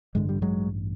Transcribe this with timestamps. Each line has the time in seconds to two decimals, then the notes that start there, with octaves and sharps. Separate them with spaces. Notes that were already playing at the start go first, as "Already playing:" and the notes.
0.15 A1 G2 D3 G#3
0.29 G3
0.42 F#3 G#3